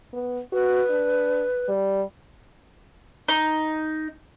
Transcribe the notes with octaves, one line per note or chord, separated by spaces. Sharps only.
B3
F#4 B4
D4
G3
D#4